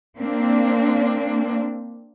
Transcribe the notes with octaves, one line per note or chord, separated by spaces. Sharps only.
A#3 C4 D4